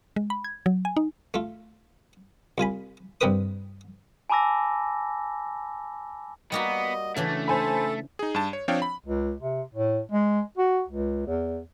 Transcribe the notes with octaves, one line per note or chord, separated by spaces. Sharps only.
G#3
B5
G#6
F#3
G#5
D#4
A3 F4
C2 F4 G#5 B5
G2 C3 C4 A#4 B4 D#6
G#5 A5 B5 D6 E6 A#6
G3 A#3 B3 F#4 D#5
C#3 E3 A3 C#4 D4
A4 C5 G#5 B5
D#4 G#4
G2 A5
C#5
F3 C4 D4 C#5 F5 G5
B5
C#2
C3
A2
G#3
F#4
C#2
E2